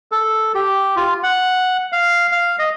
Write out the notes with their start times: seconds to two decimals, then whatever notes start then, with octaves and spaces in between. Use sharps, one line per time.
0.12 A4
0.55 G4
0.96 F4
1.23 F#5
1.92 F5
2.32 F5
2.59 D#5